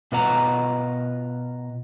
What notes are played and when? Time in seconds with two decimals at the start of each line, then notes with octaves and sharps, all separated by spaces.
0.12 B2 F4 B4 D#5 F#5 A#5